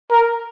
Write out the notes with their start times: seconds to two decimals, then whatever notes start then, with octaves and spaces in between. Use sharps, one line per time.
0.10 A#4